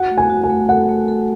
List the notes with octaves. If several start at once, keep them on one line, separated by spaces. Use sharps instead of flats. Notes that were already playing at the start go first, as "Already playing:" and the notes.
Already playing: F#4 F#5
A3
G#5
F#4
G#5
A3
A4 F#5
A3
A4